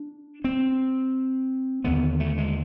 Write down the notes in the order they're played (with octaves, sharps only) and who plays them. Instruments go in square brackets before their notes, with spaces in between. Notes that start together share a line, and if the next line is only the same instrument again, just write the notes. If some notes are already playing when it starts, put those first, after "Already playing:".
Already playing: [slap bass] D4
C4
D#2 D3 B3
A3
G#3